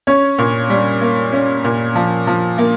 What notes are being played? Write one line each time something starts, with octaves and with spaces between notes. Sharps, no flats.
C#4 C#5
A#2
G3
A#3
C#4
A#2
F3
F3
A#3